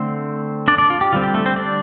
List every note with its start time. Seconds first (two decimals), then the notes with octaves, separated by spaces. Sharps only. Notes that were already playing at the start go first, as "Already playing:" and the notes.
Already playing: D3 A3 C4 C5
0.68 D4 D5
0.78 D4 D5
0.90 F4
1.01 G4
1.13 D3 G3 C4 F4
1.23 G4
1.34 A3 A4
1.46 C4 C5
1.56 D4 D5